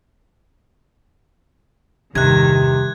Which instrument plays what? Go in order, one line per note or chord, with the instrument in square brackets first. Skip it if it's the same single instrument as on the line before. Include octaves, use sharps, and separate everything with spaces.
[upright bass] E2 [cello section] G2 D#3 [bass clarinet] C3 [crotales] F#6 G#6